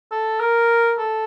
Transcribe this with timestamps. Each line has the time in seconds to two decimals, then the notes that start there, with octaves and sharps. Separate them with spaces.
0.11 A4
0.40 A#4
0.98 A4